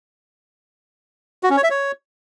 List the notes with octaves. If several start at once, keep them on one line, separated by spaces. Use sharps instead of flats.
F#4
C#4
C#5
E5
C#5